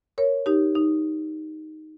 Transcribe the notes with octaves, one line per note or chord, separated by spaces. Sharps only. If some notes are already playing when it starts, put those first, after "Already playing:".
A#4 C#5
D#4 G4
D#4